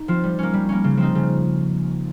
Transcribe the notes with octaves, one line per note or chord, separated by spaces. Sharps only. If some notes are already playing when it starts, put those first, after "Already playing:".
Already playing: D#4
F3 C4 F4
G3
A#3 C#4
G3
A#3 C#4
C#3
F3 C4 D#4
C#3